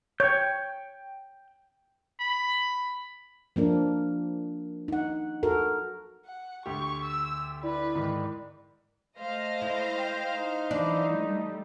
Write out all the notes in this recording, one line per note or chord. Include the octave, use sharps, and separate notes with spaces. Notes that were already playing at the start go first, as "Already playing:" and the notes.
C#5 G5 G6
B5
F3 A#3 D4 A#4
D#4 F#5
F#4 A4 A#4
F#5
D2 G4 C#6
E6
E4 B4 D5 B5
G#2 D#3
A3 C5 D#5 F5 A#6
E4
G5
D#4
E3 F#3 D4
G3 A3